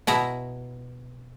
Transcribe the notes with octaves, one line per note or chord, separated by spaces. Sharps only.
B2 E4 A#5